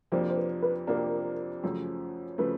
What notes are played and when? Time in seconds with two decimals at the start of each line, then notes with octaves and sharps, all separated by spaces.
0.12 F2 C3 F3 A#3 D4 C5
0.30 C5
0.37 B4
0.62 B4
0.87 F2 C3 F3 A#3 D4 A#4
1.63 F#2 C#3 F3 A3
2.38 C#3 F3 A3 B4